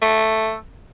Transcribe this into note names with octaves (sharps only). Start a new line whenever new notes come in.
A3